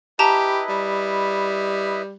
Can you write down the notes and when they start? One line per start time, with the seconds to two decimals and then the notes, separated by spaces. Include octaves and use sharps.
0.19 E4 G4 B4 D#5 A5 A#5
0.69 G3